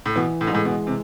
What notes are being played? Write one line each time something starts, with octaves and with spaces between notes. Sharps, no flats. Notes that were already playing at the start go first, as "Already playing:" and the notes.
A2
B2 E3
A2
G#2
A2 G#3
B2
C3